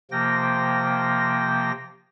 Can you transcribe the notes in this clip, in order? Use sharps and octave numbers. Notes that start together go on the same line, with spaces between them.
C3 F3 A#3 G5 A#6